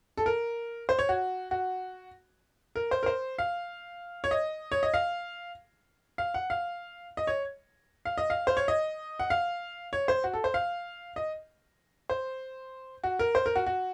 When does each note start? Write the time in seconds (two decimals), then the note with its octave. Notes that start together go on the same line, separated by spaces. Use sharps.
0.17 A4
0.26 A#4
0.89 C5
0.99 C#5
1.09 F#4
1.51 F#4
2.76 A#4
2.91 C5
3.03 A#4
3.06 C5
3.38 F5
4.24 C#5
4.31 D#5
4.72 C#5
4.83 D#5
4.94 F5
6.18 F5
6.34 F#5
6.50 F5
7.17 D#5
7.27 C#5
8.05 F5
8.18 D#5
8.30 F5
8.47 C5
8.57 C#5
8.68 D#5
9.20 F#5
9.30 F5
9.93 C#5
10.08 C5
10.24 F#4
10.34 A4
10.44 C5
10.54 F5
11.16 D#5
12.10 C5
13.04 F#4
13.19 A#4
13.35 C5
13.46 A#4
13.56 F#4
13.66 F#4